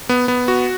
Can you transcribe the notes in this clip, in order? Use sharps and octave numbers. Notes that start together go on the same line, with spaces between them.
B3
B3
F#4